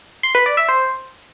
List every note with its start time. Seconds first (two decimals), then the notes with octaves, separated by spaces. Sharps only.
0.23 C6
0.35 B4
0.46 D5
0.57 E5
0.69 C5